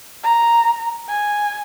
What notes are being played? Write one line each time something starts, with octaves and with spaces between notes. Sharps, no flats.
A#5
G#5